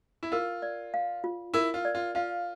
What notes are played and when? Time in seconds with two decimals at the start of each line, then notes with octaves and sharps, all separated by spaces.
0.23 E4
0.32 F4 A#4
0.62 D5
0.94 F5
1.24 F4
1.54 E4 A#4
1.74 F4
1.85 D5
1.95 F4
2.15 F4 F5